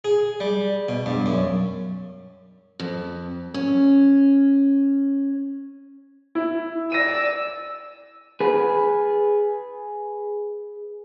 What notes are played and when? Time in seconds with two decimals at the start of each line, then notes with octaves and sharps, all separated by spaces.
0.05 G#4
0.40 G3
0.88 B2
1.06 G2
1.26 F#2
2.80 F2
3.54 C#4
6.35 E4
6.92 D5 E6 A#6 D#7
8.40 G#4 B4